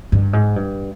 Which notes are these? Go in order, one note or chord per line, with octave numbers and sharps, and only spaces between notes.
G2
G#2
G2